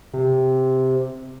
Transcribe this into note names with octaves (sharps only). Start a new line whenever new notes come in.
C3